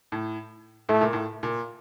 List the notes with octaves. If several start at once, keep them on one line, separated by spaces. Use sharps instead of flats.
A2
A2 A3
A#2
A2
A#2